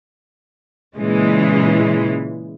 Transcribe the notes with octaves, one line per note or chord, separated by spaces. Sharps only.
A#2 C#3 E3 G#3